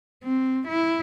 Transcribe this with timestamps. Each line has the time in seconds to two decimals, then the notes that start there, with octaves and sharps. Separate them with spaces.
0.24 C4
0.68 E4